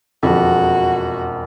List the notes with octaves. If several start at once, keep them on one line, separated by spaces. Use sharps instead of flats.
E1 F2 F#4